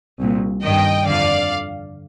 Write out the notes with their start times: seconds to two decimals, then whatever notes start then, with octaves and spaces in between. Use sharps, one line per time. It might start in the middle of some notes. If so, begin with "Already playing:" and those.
0.20 C2 A#2
0.62 G2 D#3 D#5 G5
1.06 F2 D3 D5 F5